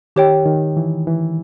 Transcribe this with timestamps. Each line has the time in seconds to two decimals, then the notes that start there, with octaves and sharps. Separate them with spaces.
0.16 D#3 G4 C#5 G5
0.46 D#3
0.77 E3
1.07 E3